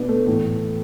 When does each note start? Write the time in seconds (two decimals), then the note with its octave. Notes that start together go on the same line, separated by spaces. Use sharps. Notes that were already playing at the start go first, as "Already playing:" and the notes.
Already playing: B2 B3 D4
0.09 A3
0.27 A2 E3